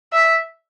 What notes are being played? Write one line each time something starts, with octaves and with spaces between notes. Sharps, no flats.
E5